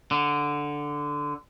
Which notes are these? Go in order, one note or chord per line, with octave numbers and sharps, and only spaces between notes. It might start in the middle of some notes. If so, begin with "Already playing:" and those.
D3